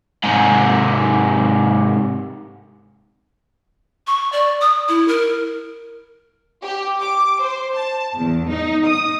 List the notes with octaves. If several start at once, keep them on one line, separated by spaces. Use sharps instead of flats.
G#2 C3
C#6
D5
D#6
E4
A#4
G4
D6
C5
A5
E2
D#4
D#6